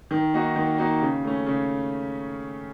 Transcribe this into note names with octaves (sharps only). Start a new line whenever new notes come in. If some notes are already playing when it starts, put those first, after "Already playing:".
D#3
A#3 D#4 F#4
D#3
A#3 D#4 F#4
C#3
A3 C#4
C#3